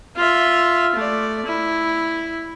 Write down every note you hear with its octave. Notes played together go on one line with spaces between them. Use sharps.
F4 E5
A3 D5
E4